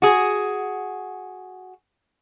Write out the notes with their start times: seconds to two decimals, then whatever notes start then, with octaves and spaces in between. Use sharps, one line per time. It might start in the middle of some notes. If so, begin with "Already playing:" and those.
0.02 F#4 G#4